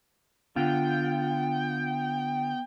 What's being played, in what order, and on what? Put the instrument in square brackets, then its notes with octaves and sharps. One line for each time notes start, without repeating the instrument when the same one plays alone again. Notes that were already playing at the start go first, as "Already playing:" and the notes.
[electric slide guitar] D3 F4 [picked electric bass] B3 [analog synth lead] G5